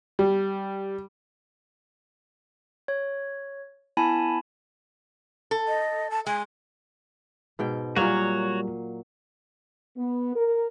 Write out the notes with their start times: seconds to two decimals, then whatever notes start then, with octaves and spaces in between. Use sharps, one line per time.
0.19 G3
2.88 C#5
3.97 B3 E4 G#5 A5 B5
5.51 A4
5.68 D#5
6.10 A5
6.27 G#3 G#5
7.59 G#2 B2 G5
7.96 A#2 F#3 G3 A#3 F#4 C#5
9.97 B3
10.34 A#4